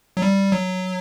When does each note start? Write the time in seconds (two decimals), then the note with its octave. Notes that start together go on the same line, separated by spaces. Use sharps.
0.17 F#3
0.22 G3
0.52 F#3